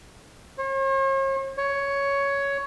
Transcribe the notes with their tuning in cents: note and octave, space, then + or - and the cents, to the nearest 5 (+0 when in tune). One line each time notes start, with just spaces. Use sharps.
C#5 -45
C#5 +10